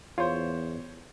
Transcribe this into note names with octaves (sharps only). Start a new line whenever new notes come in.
E2 F4 C5 C#5